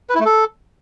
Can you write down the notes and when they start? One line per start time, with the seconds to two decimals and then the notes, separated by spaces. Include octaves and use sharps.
0.10 B4
0.15 E4
0.20 A3
0.25 A4